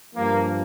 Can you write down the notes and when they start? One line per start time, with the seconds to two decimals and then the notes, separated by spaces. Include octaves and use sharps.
0.15 G2 F3 A#3